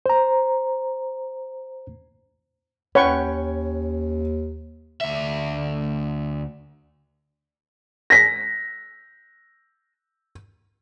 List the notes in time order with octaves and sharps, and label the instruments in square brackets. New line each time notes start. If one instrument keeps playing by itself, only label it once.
[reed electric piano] C5 A#5
[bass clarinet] D#2 [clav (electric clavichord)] C#4 G5 [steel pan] B4 F#5 C#6 [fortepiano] C#5
[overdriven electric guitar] D2 E5
[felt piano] A#6 B6